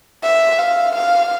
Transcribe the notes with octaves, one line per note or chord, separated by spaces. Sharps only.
E5
F5
F5